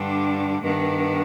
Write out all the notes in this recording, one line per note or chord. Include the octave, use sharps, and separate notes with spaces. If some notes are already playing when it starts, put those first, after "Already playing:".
Already playing: G2 D3 G3 D4
G2 D#3 B3 D4